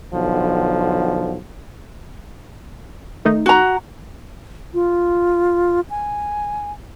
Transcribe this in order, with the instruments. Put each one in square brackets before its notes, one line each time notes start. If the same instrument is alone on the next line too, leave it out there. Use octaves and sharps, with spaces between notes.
[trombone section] B1 D3 F3
[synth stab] D#3 A3 D#4
[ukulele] F#4 A#5
[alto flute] F4
G#5